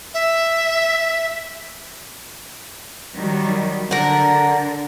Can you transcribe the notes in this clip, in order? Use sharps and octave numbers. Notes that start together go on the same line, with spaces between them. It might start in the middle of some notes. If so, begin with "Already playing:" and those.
E5
D#3 F#3 G3
D3 A#4 F#5